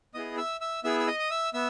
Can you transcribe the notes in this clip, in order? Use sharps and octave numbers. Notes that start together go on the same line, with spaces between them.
B3 E4 G#4 D#5 D#6
E5 E6
E5 E6
B3 E4 G#4 E5 E6
E6
D#5 D#6
D#6
E5 E6
B3 E5 E6